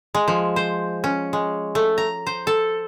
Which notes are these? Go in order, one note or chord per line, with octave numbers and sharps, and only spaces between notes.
G#3
F3
C5
C#4
G#3
A3
A#5
C5
A4